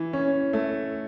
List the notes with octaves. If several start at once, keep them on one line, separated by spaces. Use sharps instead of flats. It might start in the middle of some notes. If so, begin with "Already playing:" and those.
Already playing: E3
C#4
A3